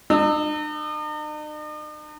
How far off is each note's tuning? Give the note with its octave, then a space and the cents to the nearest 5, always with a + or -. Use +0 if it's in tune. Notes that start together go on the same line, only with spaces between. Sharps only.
D#4 -45 E6 -30